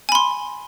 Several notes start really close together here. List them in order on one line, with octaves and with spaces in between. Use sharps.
G#5 B5 C6